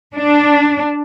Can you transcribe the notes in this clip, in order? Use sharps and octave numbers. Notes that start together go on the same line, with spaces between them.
D4